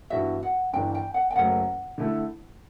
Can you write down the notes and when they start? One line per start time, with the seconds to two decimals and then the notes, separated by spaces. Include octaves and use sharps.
0.10 G2 E3 B3 F#4 E5
0.43 F#5
0.73 G1 G2 E3 G5
0.95 G5
1.14 F#5
1.31 G5
1.36 F#1 F#2 F#3 A3 F#5
1.98 D3 A3 E4 A4